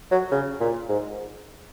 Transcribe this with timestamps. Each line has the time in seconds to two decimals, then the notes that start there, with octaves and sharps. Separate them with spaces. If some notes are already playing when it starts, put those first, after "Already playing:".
0.11 F#3
0.31 C#3
0.60 A#2
0.89 G#2